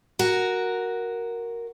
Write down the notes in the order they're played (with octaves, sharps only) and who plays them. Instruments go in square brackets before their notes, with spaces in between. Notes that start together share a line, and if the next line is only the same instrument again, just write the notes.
[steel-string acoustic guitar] F#4 A#4